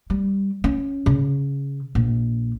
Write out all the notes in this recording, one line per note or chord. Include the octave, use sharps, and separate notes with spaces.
G3
C#4
C#3
A#1